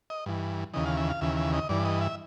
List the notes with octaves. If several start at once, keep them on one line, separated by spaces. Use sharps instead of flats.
D#5
G2 E3
D#2 C#3 E3 D#5
F5
E5
F5
D#2 C#3 E3 E5
E5
D#5
G2 E3 D5
D#5
E5